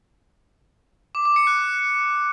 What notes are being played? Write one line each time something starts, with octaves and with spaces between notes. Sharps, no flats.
D6
D6
C#7
F#6